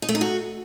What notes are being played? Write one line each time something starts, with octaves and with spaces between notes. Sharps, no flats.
D#4
A3
D#4
F#4